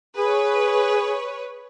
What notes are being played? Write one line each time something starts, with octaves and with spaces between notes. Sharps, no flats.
G#4 B4 C#5